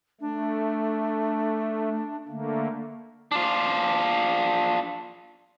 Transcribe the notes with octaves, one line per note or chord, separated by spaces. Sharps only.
A3 D4
D3 A3 A#3
D4 F4